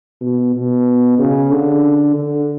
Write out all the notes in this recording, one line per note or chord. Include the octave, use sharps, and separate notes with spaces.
B2
B2
C#3
D3
D3